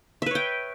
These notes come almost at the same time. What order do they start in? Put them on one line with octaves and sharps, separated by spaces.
E5 B4 C#5 G5